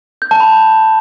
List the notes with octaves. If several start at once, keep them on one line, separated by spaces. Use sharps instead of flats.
G6
A5
B5